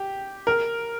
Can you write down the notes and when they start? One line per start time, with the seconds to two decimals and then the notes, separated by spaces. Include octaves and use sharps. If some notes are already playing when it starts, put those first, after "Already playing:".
Already playing: G4
0.47 A#4